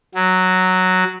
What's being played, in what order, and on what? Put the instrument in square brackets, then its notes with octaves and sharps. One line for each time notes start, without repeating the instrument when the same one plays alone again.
[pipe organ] F#3